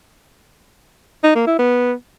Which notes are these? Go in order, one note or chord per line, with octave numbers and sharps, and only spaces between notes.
D#4
A#3
E4
B3